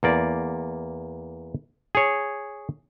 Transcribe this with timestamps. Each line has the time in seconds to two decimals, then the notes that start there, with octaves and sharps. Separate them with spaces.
0.03 E2 A#3 D5
1.95 G#4 C#5